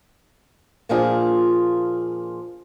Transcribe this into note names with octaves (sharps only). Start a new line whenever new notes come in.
A#2 F3 A#3 D4 F4 G#4